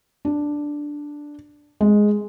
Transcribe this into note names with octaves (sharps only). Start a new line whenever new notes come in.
D4
G#3